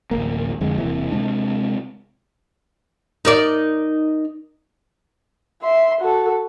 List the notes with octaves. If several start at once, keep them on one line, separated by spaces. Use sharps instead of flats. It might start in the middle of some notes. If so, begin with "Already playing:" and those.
D1 A1 A#3
F2 D3 G#3
E1 C3 E3 A#3
C3 E3 G#3 D4
D#4 A#4 D5
E5 C6
F#4 A4